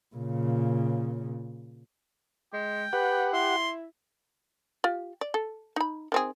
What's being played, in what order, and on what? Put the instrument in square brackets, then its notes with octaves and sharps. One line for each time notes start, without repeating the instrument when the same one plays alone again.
[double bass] A#2 C#3
[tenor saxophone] G#3 [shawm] G5
[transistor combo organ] G4 F#5 [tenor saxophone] B4
[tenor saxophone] E4 [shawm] C6
[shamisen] F4 G4
D5
A4
D#4 B5
D#3 C4 G#4